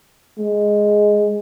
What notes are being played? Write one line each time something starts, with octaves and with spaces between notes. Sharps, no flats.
G#3